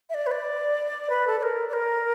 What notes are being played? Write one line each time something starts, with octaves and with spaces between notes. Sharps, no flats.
E5
D5
B4
D5
B4
A4
D5
A#4
D5
A#4